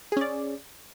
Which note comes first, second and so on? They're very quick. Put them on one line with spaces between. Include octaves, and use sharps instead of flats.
G#4 C#4 D5